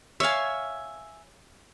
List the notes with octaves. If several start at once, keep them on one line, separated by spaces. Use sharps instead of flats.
C#5 E5 F5 G#5